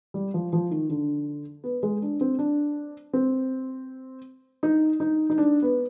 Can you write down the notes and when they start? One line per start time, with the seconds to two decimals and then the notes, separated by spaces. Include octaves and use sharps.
0.14 G3
0.34 F3
0.53 F3
0.71 D#3
0.89 D3
1.64 B3
1.83 G#3
2.02 D4
2.21 C4
2.39 D4
3.13 C4
4.63 D#4
5.00 D#4
5.30 D#4
5.38 D4
5.62 B3